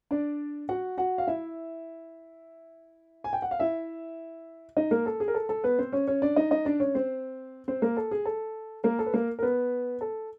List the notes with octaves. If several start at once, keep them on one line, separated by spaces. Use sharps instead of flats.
D4 D5
F#4 F#5
F#4 F#5
F5
E4 E5
G#5
G5
F#5
F5
E4 E5
D#4 D#5
A#3 A#4
A4
G#4
A#4
A4
A4
B3 B4
C4 C5
C#4 C#5
C#4 C#5
D4 D5
D#4 D#5
D#4 D#5
D4 D5
C#4 C#5
C4 C5
C4 C5
A#3 A#4
A4
G#4
A4
A#3 A#4
A4
B4
A#3 A#4
A#4
B3 B4
A4